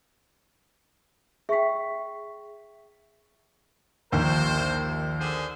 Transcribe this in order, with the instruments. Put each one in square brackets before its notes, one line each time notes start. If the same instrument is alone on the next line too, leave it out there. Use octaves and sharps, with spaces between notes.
[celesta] G#4 C#6 B6 [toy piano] E5 G5
[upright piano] A#1 D#2 [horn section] A#4 C5
[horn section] D3 G#4 C5